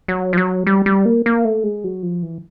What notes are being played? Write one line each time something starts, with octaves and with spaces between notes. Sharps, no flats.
F#3
F3
F#3
G3
G3
A#3
A#3
A3
G#3
F#3
F3
E3